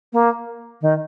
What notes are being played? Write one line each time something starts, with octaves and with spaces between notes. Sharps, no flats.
A#3
D#3